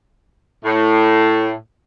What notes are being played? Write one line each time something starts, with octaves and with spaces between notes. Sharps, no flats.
A2